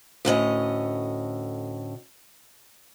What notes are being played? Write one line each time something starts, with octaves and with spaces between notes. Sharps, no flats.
D2 A2 C#4 D#5